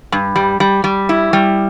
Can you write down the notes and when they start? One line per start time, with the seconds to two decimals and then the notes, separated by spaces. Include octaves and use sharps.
0.12 G2
0.36 G3
0.60 G3
0.84 G3
1.09 E4
1.33 G3